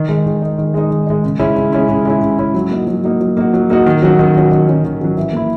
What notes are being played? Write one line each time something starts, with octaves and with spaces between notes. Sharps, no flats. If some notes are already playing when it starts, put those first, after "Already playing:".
Already playing: D#3
G#3 D#4
D#3
G#3 D#4
D#3
G#3 D#4
D#3
G#3 D#4
C#3
G#3 C#4 E4
C#3
G#3 C#4 E4
C#3
G#3 C#4 E4
C#3
G#3 C#4 E4
F#3
A#3 D#4 F#4
F#3
A#3 D#4 F#4
F#3
A#3 D#4 F#4
F#3
A#3 D#4 F#4
D#3
F#3 C#4 F#4
D#3
F#3 C#4 F#4
D#3
F#3 C#4 F#4
D#3
F#3 C#4 F#4
E3
A#3 E4